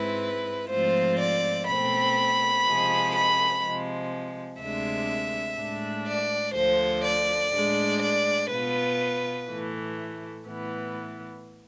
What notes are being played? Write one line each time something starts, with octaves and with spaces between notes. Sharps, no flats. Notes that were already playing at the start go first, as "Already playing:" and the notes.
Already playing: G#2 G#3 C4 E4 B4
G#2 F3 A3 C4 F4 C5
D5
B2 A3 C4 B5
C3 F3 G#3
B5
C3 F3 G#3
D2 C3 G#3 D4 E5
A2 G#3 D4
D5
D2 D3 F3 C5
D5
A2 G#3 D4
D5
B2 B3 F4 B4
A2 E3 A3
A2 E3 B3